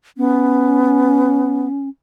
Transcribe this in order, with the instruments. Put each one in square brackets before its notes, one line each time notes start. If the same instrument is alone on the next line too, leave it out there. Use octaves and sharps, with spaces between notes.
[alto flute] B3 [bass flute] C#4